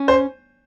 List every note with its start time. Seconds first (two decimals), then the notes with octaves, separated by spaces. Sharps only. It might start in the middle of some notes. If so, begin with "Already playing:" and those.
Already playing: C#4
0.08 C5